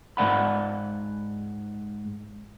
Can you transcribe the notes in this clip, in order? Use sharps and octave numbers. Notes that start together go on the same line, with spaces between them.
G#2 F3 D5 F#5 B5